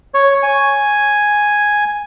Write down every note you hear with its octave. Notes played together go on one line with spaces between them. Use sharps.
C#5
G#5